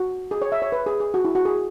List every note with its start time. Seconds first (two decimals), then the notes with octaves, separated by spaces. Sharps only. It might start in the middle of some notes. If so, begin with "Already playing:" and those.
Already playing: F#4
0.31 G#4
0.42 C#5
0.52 E5
0.62 C#5
0.72 B4
0.86 G#4
1.00 G#4
1.14 F#4
1.25 E4
1.35 F#4
1.45 G#4